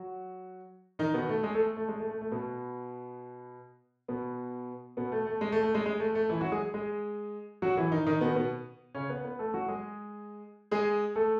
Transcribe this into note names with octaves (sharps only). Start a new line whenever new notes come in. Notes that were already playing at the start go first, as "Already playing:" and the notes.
Already playing: F#3 F#4
D#3 D#4
B2 B3
A3
G#3 G#4
A3 A4
A3
G#3
A3
A3
A3
B2 B3
B2 B3
B2 B3
A3
A3
G#3
A3
A3
G#3
G#3
A3
A3
E3 E4
F#3 F#4
G#3 G#4
G#3 G#4
F#3 F#4
E3 E4
D#3 D#4
D#3 D#4
B2 B3
B2 B3
C#3 C#4
B3 B4
B3 B4
A3 A4
F#3 F#4
G#3 G#4
G#3 G#4
A3 A4